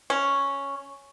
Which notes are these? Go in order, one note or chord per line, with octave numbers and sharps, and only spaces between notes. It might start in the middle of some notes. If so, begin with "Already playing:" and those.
C#4